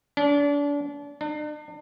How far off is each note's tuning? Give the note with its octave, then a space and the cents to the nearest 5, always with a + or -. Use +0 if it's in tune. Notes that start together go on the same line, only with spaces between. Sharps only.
D4 -30
D4 +45